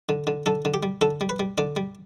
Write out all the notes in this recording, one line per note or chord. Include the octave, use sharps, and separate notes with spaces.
D3
D3
D3 A4
D3
G4
G3
D3 A4
G3
B4
G3
D3 D5
G3